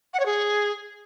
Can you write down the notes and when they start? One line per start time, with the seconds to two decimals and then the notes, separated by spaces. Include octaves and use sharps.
0.13 F#5
0.19 C#5
0.25 G#4